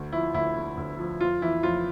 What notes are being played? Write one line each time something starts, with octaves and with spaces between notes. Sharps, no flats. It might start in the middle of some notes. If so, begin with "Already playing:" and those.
Already playing: D2
F3 E4
D2 E4
D3
D2
F3
F2 F4
E3 E4
F2 F4